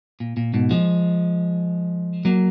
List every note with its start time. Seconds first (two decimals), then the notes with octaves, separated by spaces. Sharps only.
0.20 A#2
0.37 A#2
0.54 G#2 B2
0.71 F3 G#3
2.25 F#3 A#3